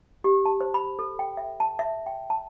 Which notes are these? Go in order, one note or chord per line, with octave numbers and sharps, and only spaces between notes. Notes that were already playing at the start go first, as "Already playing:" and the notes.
G4
A5
C5
B5
A4
G5
E5
A5
E5
G5
A5